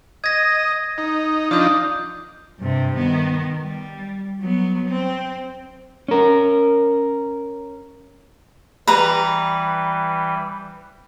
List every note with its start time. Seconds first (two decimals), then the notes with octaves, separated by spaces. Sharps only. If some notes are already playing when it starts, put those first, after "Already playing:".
0.24 D#5 G#6 A#6
0.98 D#4
1.51 F3 D4 D#4 D#6 G6
2.59 G2 C3
2.96 D#3 B3
3.61 G3
4.41 F#3 B3
4.88 C4
6.08 C#4 A#4
8.87 E3 G3 B4 A#5